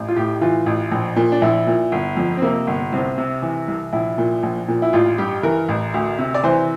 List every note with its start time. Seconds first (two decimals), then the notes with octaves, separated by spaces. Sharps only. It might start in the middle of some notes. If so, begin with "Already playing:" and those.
Already playing: A1
0.08 F4
0.16 A2 G4
0.41 E3 F4
0.66 A1
0.91 A#1
1.16 A#2
1.32 D4
1.42 A#1 E4
1.67 A#2
1.92 G1
2.17 F2
2.37 C4
2.42 C3 A#3
2.67 G1
2.92 C2 C4
3.18 C3
3.42 E3
3.68 C2
3.93 A#1 E4
4.18 A#2
4.43 A#1
4.68 A#2
4.82 E4
4.93 A1 F4
5.18 G2 G4
5.43 E3 A#4
5.68 A1
5.94 D2
6.19 C3
6.34 D5
6.44 E3 C5